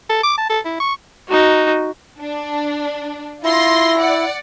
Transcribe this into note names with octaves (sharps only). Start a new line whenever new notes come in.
A4
D6
A5
A4
E4
C#6
D#4 F#4
D4
E4 F4 C6 A#6
D5 F#5